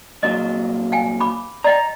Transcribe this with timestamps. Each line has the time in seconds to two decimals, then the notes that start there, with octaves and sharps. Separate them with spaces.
0.23 C2 A#2 F#3 D#5
0.92 F5 G5 G#5
1.20 B5 D6
1.64 D5 D#5 G5 A#5